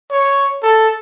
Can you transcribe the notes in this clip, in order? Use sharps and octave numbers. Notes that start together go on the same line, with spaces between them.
C#5
A4